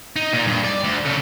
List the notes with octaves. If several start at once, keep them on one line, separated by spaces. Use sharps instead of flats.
D#4
A#2
G2
D5
D2
C#3 A4